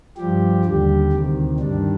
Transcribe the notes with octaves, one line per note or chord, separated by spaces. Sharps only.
G2 F3 G3 G4
D#2 D3 G3 G4
D2 C3 D#3
G2 D#3 G3 D4